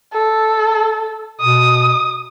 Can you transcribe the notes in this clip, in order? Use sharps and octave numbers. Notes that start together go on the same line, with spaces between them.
A4
B2 D#6